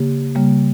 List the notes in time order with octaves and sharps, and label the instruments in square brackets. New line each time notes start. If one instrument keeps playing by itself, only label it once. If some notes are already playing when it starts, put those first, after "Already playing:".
Already playing: [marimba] C#3 A#3 G4
C#3 G3 A#3